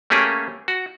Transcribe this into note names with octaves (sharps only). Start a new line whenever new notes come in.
A3 A#3 C#4 G4 G#4
F#4